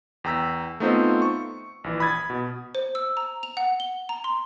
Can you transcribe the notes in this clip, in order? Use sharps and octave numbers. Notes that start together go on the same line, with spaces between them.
E2 G5 A#5 E6 B6
A3 B3 C4 D#4 F4 C5
C#6
A#1 E3
B5 D#6 G#6 A6
B2
C5
E6
A#5
F7
F#5
G7
A#5
C6